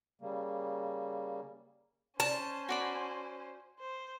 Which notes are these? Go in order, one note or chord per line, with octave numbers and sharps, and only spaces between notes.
C#3 G3 A#3
C#4 C5 A5
F#4 D5 B5
C5